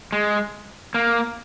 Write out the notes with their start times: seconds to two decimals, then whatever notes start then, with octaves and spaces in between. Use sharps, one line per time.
0.13 G#3
0.94 A#3